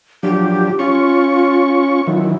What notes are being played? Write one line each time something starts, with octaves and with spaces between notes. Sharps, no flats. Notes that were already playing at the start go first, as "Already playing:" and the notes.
F3 F#3 D4 G4
C#4 F4 C#6
D#3 E3 F#3